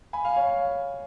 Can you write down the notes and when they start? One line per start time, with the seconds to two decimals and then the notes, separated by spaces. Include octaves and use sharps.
0.13 G#5 B5
0.25 F5 G#5
0.36 C#5 F5